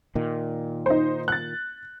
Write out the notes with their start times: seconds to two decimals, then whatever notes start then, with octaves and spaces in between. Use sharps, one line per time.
0.15 A#2 D#3
0.86 D#4 C5
1.28 F#6 A6